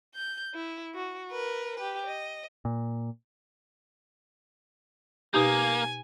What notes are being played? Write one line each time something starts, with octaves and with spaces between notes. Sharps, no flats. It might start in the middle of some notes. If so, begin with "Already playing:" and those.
G6
E4
F#4
A#4 B4
G4 B4
D#5
A#2
B2 A#3 D#4 G4 G#5